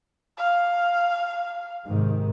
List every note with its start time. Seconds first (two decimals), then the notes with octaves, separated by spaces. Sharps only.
0.38 F5
1.84 G#2 C3 D#3